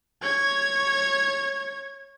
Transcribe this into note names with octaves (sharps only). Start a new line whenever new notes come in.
C#5 G#6